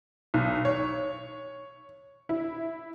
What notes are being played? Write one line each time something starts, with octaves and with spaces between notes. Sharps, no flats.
B1
C#5
E4